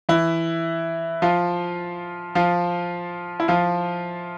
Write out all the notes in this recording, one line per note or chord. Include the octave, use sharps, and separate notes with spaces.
E3 E4
F3 F4
F3 F4
E4
F3 F4